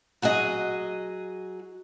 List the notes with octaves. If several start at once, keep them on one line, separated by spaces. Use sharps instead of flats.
F#3 F#4 G#4 D#5